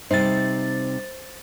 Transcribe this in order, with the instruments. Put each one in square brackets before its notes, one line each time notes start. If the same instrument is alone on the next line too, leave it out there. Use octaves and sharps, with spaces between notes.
[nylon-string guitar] C3 G3 D#4 [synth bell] C5 A6